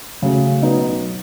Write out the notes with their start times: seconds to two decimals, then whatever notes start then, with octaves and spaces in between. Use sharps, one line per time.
0.22 C#3 F#3 A3 C#4
0.62 B2 F#3 B3 D#4